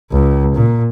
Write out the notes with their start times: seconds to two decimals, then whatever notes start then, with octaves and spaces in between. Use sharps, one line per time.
0.12 C#2
0.55 A#2